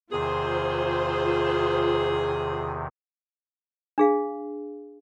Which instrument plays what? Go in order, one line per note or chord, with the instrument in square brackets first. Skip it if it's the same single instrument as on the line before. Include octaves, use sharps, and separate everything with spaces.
[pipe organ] E2 C3 D#3 [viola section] F4 C5 [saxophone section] G#4
[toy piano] D4 G#4 F5